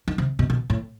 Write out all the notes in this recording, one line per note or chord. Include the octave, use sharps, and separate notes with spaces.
D#3
C3
B2
B2
A2